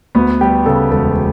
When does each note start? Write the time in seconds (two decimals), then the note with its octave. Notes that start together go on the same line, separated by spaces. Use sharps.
0.15 D2 B3 B4
0.41 G3 G4
0.66 C#3 A4
0.91 E1 A4